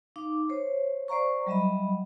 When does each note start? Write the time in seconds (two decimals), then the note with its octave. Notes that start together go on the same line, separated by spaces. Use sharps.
0.16 D#4 F5 D6
0.49 C5 C#5
1.08 C5 D5 F5 A#5 C#6
1.46 F#3 G3 D#5 E5 B5